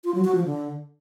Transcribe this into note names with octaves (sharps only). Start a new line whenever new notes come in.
F4
F#3
F#4
F3
D3